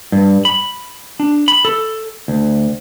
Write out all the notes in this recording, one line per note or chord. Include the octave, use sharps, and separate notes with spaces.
G2
B5
D4
B5
A4
D2